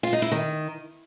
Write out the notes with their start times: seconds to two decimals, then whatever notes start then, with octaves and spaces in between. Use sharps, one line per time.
0.03 F4
0.13 D#4
0.22 E4
0.32 D#3